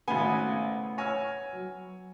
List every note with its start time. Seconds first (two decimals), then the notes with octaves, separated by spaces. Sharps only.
0.08 G#1 A2 C#3 B3 G#5
0.98 C#5 G#5 E6 F6 A#6
1.53 F#3